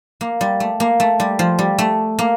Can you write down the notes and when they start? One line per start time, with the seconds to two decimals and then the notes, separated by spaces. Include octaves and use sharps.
0.21 A#3
0.41 G3
0.60 A3
0.80 A#3
1.00 A3
1.20 G3
1.39 F3
1.59 G3
1.79 A3
2.19 A#3